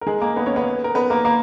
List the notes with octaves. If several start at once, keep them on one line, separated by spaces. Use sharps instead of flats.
A#4
G#3 G#4
A#3 A#4
B3 B4
C#4 C#5
B3 B4
A#4
B3 B4
A#3 A#4
A#3 A#4